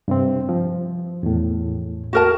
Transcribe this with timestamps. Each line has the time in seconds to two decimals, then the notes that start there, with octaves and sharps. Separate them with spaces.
0.08 G2 C3 C4
0.49 F3
1.23 E2 A2
2.13 F#4 A#4 A5